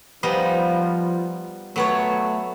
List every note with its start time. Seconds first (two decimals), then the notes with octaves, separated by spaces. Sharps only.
0.23 F3 G3 B3 D#4
1.76 F#3 A3 B3 C#5